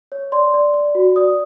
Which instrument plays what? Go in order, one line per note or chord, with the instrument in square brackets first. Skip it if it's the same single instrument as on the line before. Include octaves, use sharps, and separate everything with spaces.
[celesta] C#5
D5 C6
D5
D5
F#4
D5 D#6